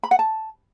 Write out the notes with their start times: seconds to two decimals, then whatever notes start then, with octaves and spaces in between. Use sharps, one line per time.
0.03 B5
0.11 F#5
0.19 A5